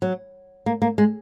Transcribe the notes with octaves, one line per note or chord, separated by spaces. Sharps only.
F#3
A#3
A#3
G#3